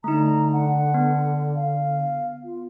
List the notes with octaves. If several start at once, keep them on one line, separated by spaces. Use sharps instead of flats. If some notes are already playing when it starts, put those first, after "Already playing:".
D3 A3 D#4 A#5
F#5
B3
F5
F4